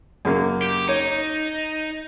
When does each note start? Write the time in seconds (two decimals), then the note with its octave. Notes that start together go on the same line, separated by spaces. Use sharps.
0.25 F#2 C#3 A#3
0.62 G4
0.89 D#4 C#5